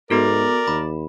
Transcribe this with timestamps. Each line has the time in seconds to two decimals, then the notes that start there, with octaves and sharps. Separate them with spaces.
0.10 G#2 B3 F#4 A4 A#4 D5
0.68 D#2 B5